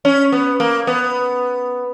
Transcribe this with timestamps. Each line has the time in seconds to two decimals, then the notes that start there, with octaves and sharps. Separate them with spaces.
0.05 C#4
0.32 B3
0.60 A#3
0.87 B3